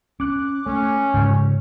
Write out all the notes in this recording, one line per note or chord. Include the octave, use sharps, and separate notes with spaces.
C#4 D6 F#6
A3 C#4
G#2 C#3